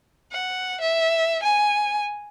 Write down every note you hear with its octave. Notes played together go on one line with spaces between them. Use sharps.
F#5
E5
G#5